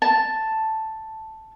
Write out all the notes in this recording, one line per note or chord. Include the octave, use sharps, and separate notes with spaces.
A5